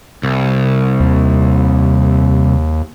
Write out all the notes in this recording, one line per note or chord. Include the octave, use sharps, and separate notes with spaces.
C2
D#2